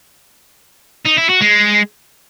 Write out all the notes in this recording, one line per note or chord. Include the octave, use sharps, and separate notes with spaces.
D#4
E4
F#4
G#3